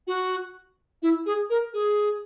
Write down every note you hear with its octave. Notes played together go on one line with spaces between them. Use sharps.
F#4
E4
G#4
A#4
G#4